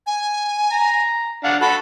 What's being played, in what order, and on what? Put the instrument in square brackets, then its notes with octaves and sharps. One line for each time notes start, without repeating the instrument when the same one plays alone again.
[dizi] G#5
[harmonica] A#5
D4 F5 F#5
[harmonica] F#4 A4 F#5 [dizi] B5